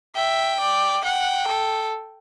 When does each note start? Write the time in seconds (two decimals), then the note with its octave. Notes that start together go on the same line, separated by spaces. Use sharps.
0.16 E5 G5
0.60 D5
1.04 F#5 G5
1.48 A4